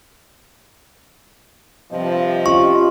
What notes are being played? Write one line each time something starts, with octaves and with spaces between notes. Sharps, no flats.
G2 C3 F3 D#5
C#4 F4 G4 C#6